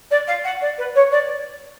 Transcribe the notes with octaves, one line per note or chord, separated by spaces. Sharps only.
D5
F5
F#5
D5
B4
C#5
D5